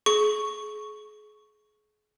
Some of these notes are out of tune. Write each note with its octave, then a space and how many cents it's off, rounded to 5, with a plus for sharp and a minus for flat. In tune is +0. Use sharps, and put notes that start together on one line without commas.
G#4 +35 C#6 +0